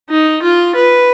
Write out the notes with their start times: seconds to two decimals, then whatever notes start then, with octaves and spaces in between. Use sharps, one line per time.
0.10 D#4
0.43 F4
0.75 B4